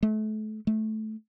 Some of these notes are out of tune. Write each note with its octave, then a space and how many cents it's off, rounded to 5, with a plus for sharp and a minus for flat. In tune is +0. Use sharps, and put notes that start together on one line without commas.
A3 -35
A3 -15